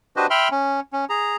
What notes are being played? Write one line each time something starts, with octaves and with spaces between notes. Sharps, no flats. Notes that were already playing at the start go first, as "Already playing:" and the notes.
D4 F#4 G4 B4 C5 D#5
E5 G5 B5 C6 F6
C#4
C#4
G#4 A#5